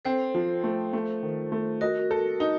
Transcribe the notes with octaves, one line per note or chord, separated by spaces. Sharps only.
C4 A4 C5
F3
A3
A3
D#3
A3
F#4 A#4 D#5
A4
D#4